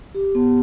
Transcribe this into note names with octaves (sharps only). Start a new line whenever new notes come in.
G4
B3